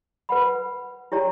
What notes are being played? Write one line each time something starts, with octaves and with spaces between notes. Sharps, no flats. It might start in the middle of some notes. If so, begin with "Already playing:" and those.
B4 F#5 B5
E4 G4 C#5 G5 A#5